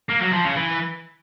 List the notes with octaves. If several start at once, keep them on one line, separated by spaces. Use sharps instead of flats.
A#3
F#3
F3
C#3
E3